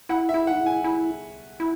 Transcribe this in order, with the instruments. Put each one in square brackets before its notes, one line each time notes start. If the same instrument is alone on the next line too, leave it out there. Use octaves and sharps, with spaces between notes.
[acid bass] E4 [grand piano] F#5
[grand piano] E5
[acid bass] E4
[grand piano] F#5
[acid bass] D#4
E4
[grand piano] G#5
[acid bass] E4
E4